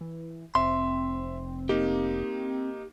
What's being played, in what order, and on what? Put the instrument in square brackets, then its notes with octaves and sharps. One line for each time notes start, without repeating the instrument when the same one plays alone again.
[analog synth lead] E3
[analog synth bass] F1 [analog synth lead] C4 [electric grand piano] E5 [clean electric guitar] C6
[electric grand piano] A#3 D#4 [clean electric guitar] G4